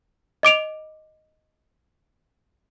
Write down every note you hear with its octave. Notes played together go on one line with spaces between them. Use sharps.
D#5 D6 D7 F7